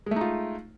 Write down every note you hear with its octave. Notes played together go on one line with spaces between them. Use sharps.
G#3 A3 D#4 F4